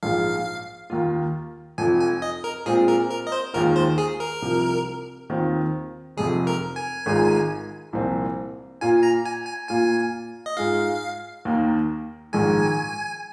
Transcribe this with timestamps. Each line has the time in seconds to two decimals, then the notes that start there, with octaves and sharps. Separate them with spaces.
0.03 A#1 G#2 F3 G#3 F4 F5
0.90 D#2 D#3 A#3 F4
1.78 F1 F2 F3 G#5
2.00 G#5
2.22 D#5
2.44 A#4
2.66 A#2 G#3 C4 F4 G#4
2.88 A#4
3.10 A#4
3.27 D#5
3.32 C5
3.54 D#2 D#3 G#3 F4 A#4
3.76 C5
3.98 G#4
4.20 A#4
4.42 C2 C3 F3
5.30 D#2 D#3 C4 F4
6.17 F1 F2 C3 F3 G#4
6.47 A#4
6.76 G#5
7.06 G#1 G#2 G#3 F4
7.93 C2 A#2 F3 C4
8.81 A#2 A#3 F4 G#5
9.03 A#5
9.25 G#5
9.47 G#5
9.69 A#2 A#3 F4 G#5
10.46 D#5
10.57 G#2 G#3 F4 F5
11.45 D#2 D#3 A#3
12.33 A#1 G#2 D#3 G#3 G#5